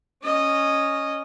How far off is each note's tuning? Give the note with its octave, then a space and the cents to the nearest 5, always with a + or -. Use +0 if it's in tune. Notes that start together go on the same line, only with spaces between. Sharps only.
C#4 +0 D#5 -10